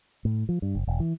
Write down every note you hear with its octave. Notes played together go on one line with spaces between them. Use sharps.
A2
F3
G2
F#1
E1
E3